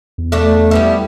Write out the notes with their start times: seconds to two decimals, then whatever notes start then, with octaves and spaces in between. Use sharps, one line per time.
0.18 E2
0.32 A3 D4
0.71 G3 B3 E4